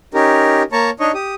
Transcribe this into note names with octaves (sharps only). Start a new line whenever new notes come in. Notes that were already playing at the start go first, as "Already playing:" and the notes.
C#4 D#4 G4 A#4
A#3 C#5 A5 A#5 C#6
D4 D#4 C#5 D#5 C#6
G4 D#6